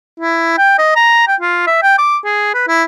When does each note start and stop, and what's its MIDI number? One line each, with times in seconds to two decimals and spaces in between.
0.20 0.53 64
0.58 0.74 79
0.78 0.93 75
0.96 1.27 82
1.28 1.36 79
1.40 1.65 65
1.67 1.81 76
1.82 1.95 79
1.99 2.17 86
2.25 2.52 68
2.54 2.67 71
2.68 2.83 64